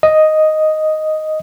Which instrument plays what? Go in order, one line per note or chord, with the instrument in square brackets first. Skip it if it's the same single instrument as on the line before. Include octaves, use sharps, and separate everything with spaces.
[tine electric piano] D#5